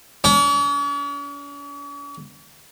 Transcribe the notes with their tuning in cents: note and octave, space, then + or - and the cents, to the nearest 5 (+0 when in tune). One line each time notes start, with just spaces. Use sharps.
C#4 +45